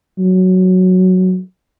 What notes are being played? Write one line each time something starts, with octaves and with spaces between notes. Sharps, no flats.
F#3